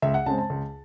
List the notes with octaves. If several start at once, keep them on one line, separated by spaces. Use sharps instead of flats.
C#2 E5
F#5
C#3 G#3 C4 A5
A5
C#2